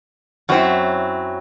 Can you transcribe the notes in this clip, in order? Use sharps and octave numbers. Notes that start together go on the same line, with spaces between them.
F#2 F#3 C4 E4